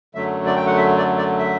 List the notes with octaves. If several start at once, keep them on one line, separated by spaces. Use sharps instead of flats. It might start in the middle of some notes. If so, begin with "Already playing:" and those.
F#2 D3 F#3 A3 E5
D5
G5
F#5
E5
D5
D5
E5